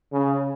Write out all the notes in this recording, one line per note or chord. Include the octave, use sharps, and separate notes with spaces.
C#3